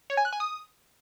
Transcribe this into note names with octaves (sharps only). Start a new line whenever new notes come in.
C#5
G#5
F#6
G#5
D#6